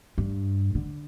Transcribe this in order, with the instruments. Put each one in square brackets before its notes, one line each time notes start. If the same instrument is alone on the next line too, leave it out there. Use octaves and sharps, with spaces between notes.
[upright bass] G2
D3